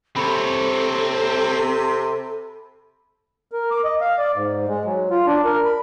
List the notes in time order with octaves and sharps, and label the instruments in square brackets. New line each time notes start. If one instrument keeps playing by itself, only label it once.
[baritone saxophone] C3 [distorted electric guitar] C4 C#5 [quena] A4 [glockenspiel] B5
[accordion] A#4
D6
D#5
F5
D5
G#2
G#3
F#3
F4
D4
A#4
B5